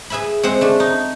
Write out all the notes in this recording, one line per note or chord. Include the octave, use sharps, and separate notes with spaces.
G#4 B4 E5 G#5 B5
G#3 C4 C5 F#5
A3 D4
D#4